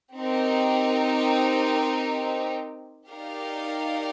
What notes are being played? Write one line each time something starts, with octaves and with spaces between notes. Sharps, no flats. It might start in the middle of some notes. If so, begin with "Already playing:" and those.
C4 D#4 G4 A#4
D#4 G4 A#4 D5 F5